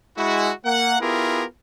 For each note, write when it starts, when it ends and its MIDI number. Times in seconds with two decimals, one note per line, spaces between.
0.17 0.50 56
0.17 0.50 64
0.17 0.50 66
0.65 1.00 58
0.65 1.00 78
1.00 1.43 59
1.00 1.43 64
1.00 1.43 65
1.00 1.43 67
1.00 1.43 68
1.00 1.43 70